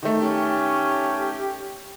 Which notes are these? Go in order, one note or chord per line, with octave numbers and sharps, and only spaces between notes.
D#3 A3
C#4 G4